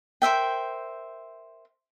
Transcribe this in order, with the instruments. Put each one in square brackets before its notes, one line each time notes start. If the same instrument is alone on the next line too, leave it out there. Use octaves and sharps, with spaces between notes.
[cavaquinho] A#4 C5 E5 G5